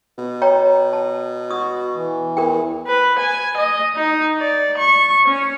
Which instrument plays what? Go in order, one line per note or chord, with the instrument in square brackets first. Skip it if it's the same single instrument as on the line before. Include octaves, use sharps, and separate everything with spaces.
[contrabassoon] B2
[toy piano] C#5 G5 A#5
A5
[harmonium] F#4 [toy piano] D#6
[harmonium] E3
[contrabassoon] E2 [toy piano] A#4 G5
[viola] B4
G#5
D#5
D#4
D5
C#6
C#4